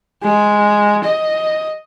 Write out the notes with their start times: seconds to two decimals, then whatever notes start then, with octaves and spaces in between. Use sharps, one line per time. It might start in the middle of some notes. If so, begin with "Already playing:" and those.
0.23 G#3
1.04 D#5